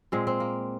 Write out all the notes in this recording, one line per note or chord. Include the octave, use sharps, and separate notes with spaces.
A#2 G#3 C4
C4
A#3